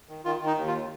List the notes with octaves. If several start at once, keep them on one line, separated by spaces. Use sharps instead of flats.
D#3
D#3 F4
D#3
D#4
D#2
F4
D#3